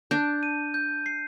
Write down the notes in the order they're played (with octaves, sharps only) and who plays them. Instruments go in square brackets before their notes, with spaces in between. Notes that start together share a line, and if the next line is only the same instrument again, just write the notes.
[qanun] D4 [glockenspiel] G6
[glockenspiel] D#7
G6
C7